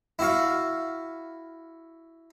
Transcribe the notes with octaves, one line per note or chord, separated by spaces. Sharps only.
E4 F#4 F5